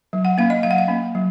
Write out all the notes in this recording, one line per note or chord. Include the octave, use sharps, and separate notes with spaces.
F#3
F#5
A#3 C#4 F5
D#5
F#3 F5
F#5
F5
A#3 C#4
F#3